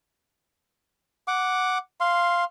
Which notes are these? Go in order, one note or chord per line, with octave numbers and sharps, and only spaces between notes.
F#5 D6
F5 C6